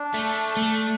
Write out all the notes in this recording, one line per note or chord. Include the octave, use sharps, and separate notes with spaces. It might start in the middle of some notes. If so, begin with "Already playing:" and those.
Already playing: D4
A3
A3